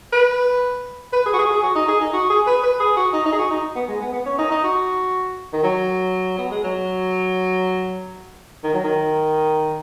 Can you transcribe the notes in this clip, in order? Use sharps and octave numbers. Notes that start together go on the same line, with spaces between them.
B4
B4
G#4
F#4
G#4
F#4
G#4
F#4
D#4
G#4
D#4
F#4
G#4
B4
B4
G#4
F#4
D#4
D#4
G#4
F#4
D#4
B3
G#3
B3
B3
C#4
D#4
D#4
F#4
D#3
F#3
B3
G#3
F#3
D#3
F#3
D#3